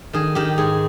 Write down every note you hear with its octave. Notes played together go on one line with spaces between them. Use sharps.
D#3 G#4
D#3 G4
G#2 G#4